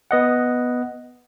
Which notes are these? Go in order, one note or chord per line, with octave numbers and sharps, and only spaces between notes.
B3 D#5 F#5